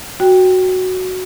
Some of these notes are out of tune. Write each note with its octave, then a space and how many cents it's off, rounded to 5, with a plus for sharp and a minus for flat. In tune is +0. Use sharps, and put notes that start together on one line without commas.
F#4 +0 G5 +0